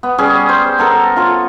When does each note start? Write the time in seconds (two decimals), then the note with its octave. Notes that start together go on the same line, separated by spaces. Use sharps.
0.03 B3
0.18 G3 C#4 G#4
0.49 C5
0.78 B3 A4 A#4
1.16 F4 A4 C#5